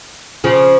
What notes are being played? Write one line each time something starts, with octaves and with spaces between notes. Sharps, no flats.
C#3 F3